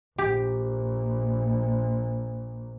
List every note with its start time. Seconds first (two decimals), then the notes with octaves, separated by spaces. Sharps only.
0.18 A#1 G4